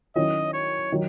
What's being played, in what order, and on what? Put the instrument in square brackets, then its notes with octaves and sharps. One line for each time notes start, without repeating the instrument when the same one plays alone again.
[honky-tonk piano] D#3 F#3 C#4 E4 [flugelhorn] D#5
[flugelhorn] C#5
[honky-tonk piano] D#3 F#3